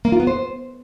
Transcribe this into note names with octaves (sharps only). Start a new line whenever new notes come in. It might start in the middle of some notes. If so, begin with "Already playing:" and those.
A#3
F4
B3
C5